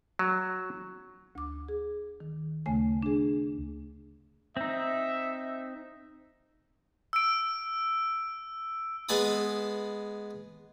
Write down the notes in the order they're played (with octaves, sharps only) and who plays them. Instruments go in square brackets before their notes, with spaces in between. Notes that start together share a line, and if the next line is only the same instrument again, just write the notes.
[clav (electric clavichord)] F#3
[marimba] D2 D6
G#4
D#3
D2 C#3 A3 G#5
D4 G#4
[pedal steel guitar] C4 D#4 [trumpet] E5
[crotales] E6 D7
[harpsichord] G#3 B3 G#5 A5 B5 D#6